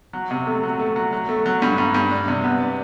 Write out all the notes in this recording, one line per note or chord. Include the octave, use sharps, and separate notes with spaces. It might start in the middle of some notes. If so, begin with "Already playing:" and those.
F#3
C3
A3
F#3
A3
F#3
F#3
A3
F#3
G2
G2
G2
D4
C3
B3
D4